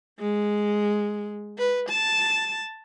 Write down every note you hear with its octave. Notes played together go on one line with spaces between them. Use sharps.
G#3
B4
A5